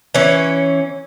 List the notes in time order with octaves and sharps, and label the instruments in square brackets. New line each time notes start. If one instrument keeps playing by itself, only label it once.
[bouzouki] E3 C#4